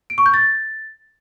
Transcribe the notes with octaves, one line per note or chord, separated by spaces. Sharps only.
D7
C#6
G6
A6